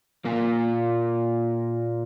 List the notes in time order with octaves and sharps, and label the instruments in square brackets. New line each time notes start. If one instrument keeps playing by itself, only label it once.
[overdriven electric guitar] A#2 A#3